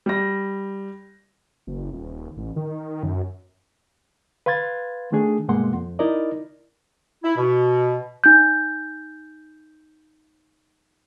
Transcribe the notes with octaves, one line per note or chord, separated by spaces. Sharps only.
G3 A#6
F#1
D#1
A1
D#3
F#2
B4 F5 C6 G#6 A6
D#3 A3 D4 G#4
G2 B2 G#3 A#3 F#5 C6
F2
D#4 E4 A#4 D5 D#5
E4
B2
D#4 G6